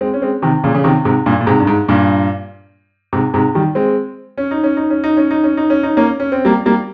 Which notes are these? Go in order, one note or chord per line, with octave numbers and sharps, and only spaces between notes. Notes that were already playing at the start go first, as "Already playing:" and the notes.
G#3 C4
C#4
G#3 C4
C3 D#3
A#2 C#3
C#3
C3 D#3
G#2 C3
G2 A#2
A#2
G#2 C3
G2
G#2
G2 A#2
G#2 C3
G#2 C3
D#3 G3
G#3 C4
C#4
D#4
C#4
D#4
C#4
D#4
C#4
D#4
C#4
D#4
C#4
D#4
A#3 C#4
C#4
C4
G3 A#3
G3 A#3